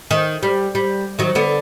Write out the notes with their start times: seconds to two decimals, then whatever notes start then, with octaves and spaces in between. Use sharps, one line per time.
0.11 D#3
0.43 G3
0.75 G3
1.19 D#3 F#3
1.35 D3 B3